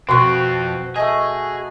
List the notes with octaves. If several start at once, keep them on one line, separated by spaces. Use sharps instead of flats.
F2 B2 C4 F#4 B4 C#6
A3 G#4 D#5